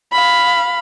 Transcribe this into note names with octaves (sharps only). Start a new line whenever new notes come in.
F5 B5